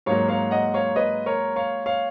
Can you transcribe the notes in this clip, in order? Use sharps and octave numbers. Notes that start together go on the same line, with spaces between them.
G#2 F#3 A#3 C#5 F5
C#5 F5
D#5 F#5
C#5 F5
B4 D#5
A#4 C#5
C#5 F5
C#5 F5